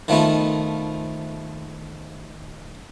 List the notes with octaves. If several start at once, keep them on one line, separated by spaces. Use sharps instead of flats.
D#3 F3 A3 B3 D#4